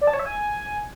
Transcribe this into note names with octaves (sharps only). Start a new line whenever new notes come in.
D5
A5
C#5
E5
G#5